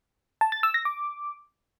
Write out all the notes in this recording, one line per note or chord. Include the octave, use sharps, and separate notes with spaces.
A5
A6
E6
A#6
D6